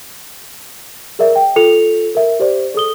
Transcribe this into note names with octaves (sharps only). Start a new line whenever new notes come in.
G#4 A#4 D5 E5
G5
F4 A4 C#7 F7
A#4 E5
G4 C5 D5
G#4 A4 D#6 G7